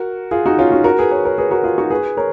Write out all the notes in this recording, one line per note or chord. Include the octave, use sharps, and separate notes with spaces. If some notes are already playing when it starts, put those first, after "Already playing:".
Already playing: F#4 A#4
F4 G#4
D#4 F#4
C#4 F4
D#4 F#4
F#4 A#4
G#4 B4
A#4 C#5
A#4 C#5
G#4 B4
F#4 A#4
F4 G#4
D#4 F#4
G#4 B4
A#4 C#5